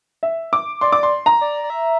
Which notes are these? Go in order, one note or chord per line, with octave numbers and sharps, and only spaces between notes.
E5
D6
D5 C6
D6
C6
A#5
D5
D5
E5